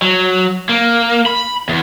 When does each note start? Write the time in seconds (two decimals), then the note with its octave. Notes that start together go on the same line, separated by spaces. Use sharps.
0.02 F#3
0.69 A#3
1.26 B5
1.69 E2